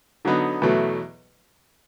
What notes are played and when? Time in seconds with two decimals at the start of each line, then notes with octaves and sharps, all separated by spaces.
0.25 D3 F#3 B3 D#4
0.62 E2 B2 F#3 A3